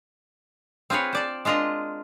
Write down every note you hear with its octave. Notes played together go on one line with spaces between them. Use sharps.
C4 F4 G#4 B4 C#5
C5 D5 A5
G#3 D4 F4 A#4 D#5